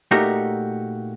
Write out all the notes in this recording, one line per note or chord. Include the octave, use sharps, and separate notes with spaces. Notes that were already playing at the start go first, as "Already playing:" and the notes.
A#2 A3 D#4 F#4 G4 A#4